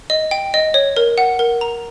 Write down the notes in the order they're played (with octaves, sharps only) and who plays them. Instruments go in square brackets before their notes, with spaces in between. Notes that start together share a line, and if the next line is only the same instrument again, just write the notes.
[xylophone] D#5
G5
D#5
C#5
A#4
F#5
A#4
A#5